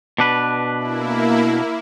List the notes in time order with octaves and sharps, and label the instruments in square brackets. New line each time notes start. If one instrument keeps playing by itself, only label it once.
[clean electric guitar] B2 D4 B4
[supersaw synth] A#3 E4